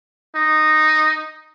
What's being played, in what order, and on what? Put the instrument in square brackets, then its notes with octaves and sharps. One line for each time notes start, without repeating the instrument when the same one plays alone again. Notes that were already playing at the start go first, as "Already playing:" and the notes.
[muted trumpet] D#4